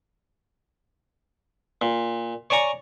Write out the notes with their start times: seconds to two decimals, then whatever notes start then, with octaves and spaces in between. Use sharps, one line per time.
1.82 A#2
2.50 C#5 D5 G#5 A#5 C#6